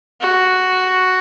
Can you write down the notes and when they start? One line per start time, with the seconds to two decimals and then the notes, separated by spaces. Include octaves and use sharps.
0.21 F#4